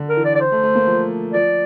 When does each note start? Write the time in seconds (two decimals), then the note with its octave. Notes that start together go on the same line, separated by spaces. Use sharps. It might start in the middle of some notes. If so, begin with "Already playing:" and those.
Already playing: D3
0.09 A#4
0.17 E3
0.25 D5
0.35 D5
0.40 C5
0.52 A3
0.63 A3
0.75 A#3
0.87 F3
1.33 F3 D5